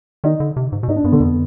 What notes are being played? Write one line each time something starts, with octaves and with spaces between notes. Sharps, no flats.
D#3 D#4
D3
C3
G#2
B2
G#2 D#4
D4
G2 B3
D3
F2 B3